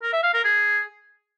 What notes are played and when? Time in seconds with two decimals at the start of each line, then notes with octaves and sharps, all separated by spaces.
0.02 A#4
0.13 E5
0.23 F5
0.34 A#4
0.44 G#4